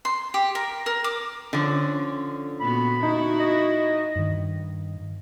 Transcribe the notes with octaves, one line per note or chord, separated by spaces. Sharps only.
C6
G4
A#4
A#4
D6
D3 F3 C#4
A#2 B3 F#4 B5
D#4 E4 F#4
D#5
G2 D#3